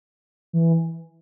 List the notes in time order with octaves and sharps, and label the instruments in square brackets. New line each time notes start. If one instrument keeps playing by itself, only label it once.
[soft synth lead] E3